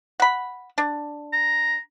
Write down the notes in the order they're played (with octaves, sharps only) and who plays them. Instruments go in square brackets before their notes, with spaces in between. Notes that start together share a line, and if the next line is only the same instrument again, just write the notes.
[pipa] F#5 B5
D4
[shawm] A#5